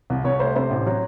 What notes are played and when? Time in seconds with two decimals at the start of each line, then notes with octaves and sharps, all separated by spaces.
0.10 C2
0.24 C2 C#5
0.40 A3 C5
0.56 C3 C5
0.71 A1
0.87 F#3